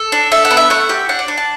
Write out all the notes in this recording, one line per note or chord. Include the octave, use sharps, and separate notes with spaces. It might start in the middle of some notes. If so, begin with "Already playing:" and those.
Already playing: A4
D4
A4 E5
F#5
B3
E5
A3 F#5
G4
D4 F#5
D5
D4
A5